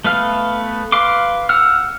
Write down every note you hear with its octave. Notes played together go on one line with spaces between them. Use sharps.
A3 B3 B4 F5 F6
B4 F5 C6 D6
F#5 E6 F6